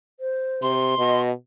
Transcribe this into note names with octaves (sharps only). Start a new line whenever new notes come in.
C5
C3 C6
B2 D#5